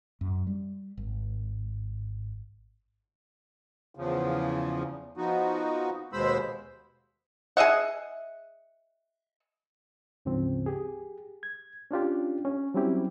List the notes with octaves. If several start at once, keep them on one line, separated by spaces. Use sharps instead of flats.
F#2
G3
G#1
E2 C#3 F3
F3 B3 D#4 F#4
D#2 B2 G#3 C5 B5 E6
G#4 D#5 E5 F#5
D2 G#2 C#3 F3 C4
G4 G#4
G#6
C#4 D4 F4 G4
C#4
F#3 G3 C4 C#4 E4 G4